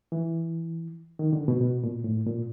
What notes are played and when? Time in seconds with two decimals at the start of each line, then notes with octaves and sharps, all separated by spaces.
0.12 E3
1.19 D#3
1.33 D3
1.48 B2
1.61 B2
1.83 A#2
2.04 A2
2.26 A#2